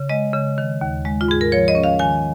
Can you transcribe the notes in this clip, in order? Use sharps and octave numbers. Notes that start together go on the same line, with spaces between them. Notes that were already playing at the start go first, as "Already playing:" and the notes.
Already playing: C#3
G#3 D#5
C#3
D#3
D#2
G#3
F4
G#2 G#4
A#4
F3 C#5
D#5
C#4
F5
D#3 G#5